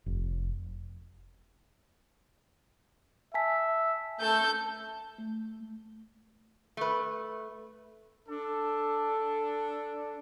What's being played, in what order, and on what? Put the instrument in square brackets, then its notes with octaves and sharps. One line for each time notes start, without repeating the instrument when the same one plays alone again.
[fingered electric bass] F1
[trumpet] E5 [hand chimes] G#5 A5 B6
[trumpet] A3 [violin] A4 G6
[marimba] A3
[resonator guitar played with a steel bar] A3 B4
[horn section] D4 A4